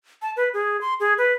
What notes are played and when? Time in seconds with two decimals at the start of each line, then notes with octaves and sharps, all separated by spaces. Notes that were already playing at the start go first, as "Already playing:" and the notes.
0.22 A5
0.37 B4
0.54 G#4
0.81 C6
1.00 G#4
1.18 B4